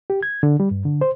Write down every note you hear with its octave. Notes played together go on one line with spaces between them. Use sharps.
G4
G#6
D3
G3
G2
D3
C5